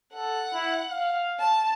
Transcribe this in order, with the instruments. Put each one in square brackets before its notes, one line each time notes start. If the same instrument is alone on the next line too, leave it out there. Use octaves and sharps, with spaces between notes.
[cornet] A4 [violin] F#5
[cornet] E4
F5
[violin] A5